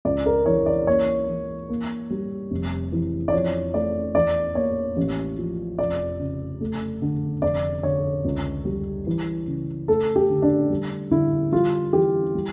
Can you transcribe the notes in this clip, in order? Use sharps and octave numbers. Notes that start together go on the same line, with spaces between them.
C#2 D5
A#4
E3 C#5
D5
A#3 C#5
E3
A#3
G3
F1
E3
D5
F2 C#5
A3 D5
E2 D5
A#3 C#5
A1
F3
F1 D5
C#3
A3
D3
F1 D5
D3 C#5
C#2
G3
E3
C#3
A3 A4
G4
D3
D4
G3
D3 E4
G3 F4
E3 G4
G3